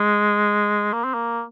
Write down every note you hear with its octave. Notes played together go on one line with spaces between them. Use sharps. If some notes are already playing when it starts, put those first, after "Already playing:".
Already playing: G#3
A#3
C4
A#3